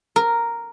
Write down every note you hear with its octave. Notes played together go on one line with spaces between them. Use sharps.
A#4